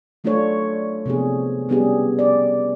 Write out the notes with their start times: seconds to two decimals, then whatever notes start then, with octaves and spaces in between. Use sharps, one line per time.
0.24 F#3 A3 D4 F4 A4 C#5
1.06 C3 F3 B3 D4 G#4
1.69 G3 B3 C#4 D4 G4 G#4
2.19 D5